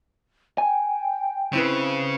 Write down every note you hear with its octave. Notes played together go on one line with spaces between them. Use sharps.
G5 G#5
C#3 C4 E4 B4